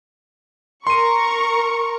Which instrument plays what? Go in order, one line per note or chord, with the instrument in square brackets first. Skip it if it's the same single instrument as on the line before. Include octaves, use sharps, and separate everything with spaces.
[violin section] A#4 C#6 [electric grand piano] C6 D#7